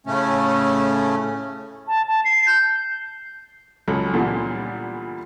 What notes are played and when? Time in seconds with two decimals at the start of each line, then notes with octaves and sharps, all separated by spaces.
0.07 A2 C#3 A3 C#4
1.88 A5
2.08 A5
2.25 C7
2.47 G6
3.88 C#2 F#3 A4 B5
4.14 A#2 D3 E3 G3 B3